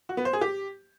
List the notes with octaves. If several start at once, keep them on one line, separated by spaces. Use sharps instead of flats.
F#4
B3
C5
G#4
G4